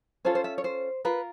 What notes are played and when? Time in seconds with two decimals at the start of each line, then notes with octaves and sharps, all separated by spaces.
0.25 C#4 F4 A4 C5
0.35 C5
0.44 E5
0.58 C#5
0.64 C5
1.05 F4 A#4 B4